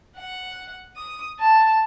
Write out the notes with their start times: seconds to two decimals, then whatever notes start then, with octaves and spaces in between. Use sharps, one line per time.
0.17 F#5
0.96 D#6
1.40 A5